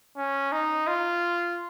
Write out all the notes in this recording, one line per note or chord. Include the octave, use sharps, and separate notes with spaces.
C#4
D#4
F4